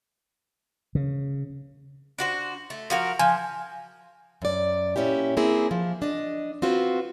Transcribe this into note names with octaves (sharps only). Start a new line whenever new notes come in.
C#3
D4 F#4 C5
A3
F3 F#4 A#4
F3 G#5
F#2 D5
A#2 C#4 E4 G4
A#3 C4 E4 G#4
F3
D4 D#5
C4 F4 F#4 B4